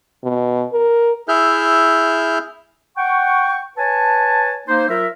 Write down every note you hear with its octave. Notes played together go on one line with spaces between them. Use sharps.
B2
A#4
E4 G#4 E5 F6 G6
F#5 G5 C#6
B4 C#5 G#5 A5
A#3 D#4 C5
F#3 F4 A#4 E5